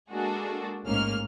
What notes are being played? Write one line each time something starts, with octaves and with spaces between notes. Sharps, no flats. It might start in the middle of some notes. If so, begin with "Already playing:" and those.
G#3 A#3 D4 F#4 G#4 A4
A1 G#2 A#3 C#4 F6